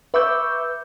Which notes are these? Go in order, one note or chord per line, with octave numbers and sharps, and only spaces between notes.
B4 E5 C#6 D6 E6 G6